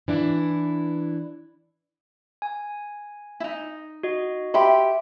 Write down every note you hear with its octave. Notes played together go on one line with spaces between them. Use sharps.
E3 D4 E4
G#5
D#4 E4
F#4 D#5
G4 E5 B5 C6